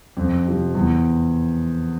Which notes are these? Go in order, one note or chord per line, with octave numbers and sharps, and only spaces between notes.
F2
C3 F3
E2